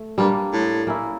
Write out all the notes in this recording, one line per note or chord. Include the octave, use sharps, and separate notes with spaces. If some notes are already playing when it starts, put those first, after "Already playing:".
Already playing: A3
G2 G3 A#3 D4
A2
A#3 C#4 E4